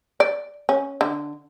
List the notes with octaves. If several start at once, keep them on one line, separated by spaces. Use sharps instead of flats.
D5
C#4
D3